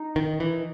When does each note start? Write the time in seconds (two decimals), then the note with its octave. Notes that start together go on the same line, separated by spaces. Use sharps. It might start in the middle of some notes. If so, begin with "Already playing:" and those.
Already playing: D#4
0.16 D#3
0.40 E3